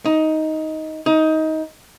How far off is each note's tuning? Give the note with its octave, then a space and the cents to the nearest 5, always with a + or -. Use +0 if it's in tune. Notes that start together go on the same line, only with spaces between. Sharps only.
D#4 +10
D#4 +20